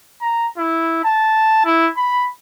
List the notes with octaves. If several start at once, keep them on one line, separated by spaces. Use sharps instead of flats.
A#5
E4
A5
E4
B5